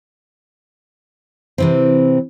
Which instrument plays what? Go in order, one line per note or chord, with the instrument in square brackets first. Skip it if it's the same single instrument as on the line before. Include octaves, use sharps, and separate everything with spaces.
[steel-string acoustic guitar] C3 E3 C4